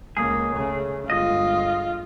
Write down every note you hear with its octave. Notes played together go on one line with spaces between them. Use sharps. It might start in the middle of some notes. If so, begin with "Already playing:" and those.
C#2 A#3 G#4
C#3 A3
G1 G#3 F4 D#5